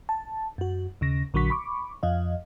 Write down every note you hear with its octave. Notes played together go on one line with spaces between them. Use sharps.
A5
F#2 F#4
D#2 C#3 A#6
A#1 D3 F#3 F#4 C#6 B6
B5 C#6 D6
F2 F3 D#5 F5